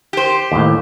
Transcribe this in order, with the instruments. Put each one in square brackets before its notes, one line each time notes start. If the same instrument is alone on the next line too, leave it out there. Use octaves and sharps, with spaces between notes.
[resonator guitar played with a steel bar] G4 C5
[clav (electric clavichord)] D#2 A2